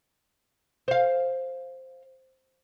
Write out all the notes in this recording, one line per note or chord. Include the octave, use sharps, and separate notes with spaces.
C5 F5